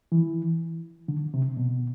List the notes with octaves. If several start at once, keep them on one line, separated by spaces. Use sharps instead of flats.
E3
D3
C3
B2